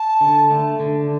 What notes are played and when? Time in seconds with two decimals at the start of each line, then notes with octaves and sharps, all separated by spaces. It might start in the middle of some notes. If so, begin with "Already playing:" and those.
Already playing: A5
0.21 D3
0.51 A3
0.80 D3